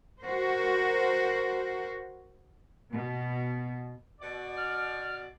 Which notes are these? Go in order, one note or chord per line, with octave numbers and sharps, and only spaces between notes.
F#4 A#4 C5
B2
B2 D5
F6